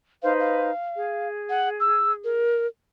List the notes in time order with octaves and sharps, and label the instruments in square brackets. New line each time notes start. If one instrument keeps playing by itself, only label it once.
[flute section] D#4 B4 C5 [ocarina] F5
[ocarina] F5
[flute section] G#4
[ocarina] F#5
E6
A#4